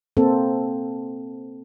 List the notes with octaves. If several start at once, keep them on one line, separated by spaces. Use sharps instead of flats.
A#3 C4 A4